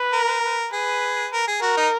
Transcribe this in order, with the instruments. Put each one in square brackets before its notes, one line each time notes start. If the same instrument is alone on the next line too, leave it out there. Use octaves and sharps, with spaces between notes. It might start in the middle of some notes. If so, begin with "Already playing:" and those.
Already playing: [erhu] B4
[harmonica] A#4
[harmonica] G#4 [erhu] B4
[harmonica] A#4
G#4
[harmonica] F#4 [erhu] A#4
[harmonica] D#4